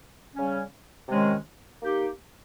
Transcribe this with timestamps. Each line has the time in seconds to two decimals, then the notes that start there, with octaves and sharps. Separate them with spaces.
0.36 C#3 G3 C#4
1.08 C3 D#3 G#3 C#4
1.82 A#3 D#4 G4